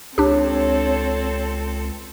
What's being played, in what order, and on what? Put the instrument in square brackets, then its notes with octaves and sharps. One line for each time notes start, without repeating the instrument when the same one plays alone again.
[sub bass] C#2 [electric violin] C4 A4 [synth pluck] D4 G4 [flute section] C#5